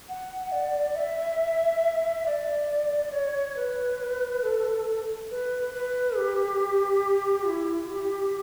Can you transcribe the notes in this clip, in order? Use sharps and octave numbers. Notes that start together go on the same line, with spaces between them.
F#5
D5
E5
D5
C#5
B4
A4
B4
B4
G4
E4
G4